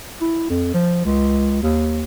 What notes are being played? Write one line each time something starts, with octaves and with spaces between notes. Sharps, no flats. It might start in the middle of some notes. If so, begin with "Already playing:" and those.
E4
F2
F3
C#2
D#2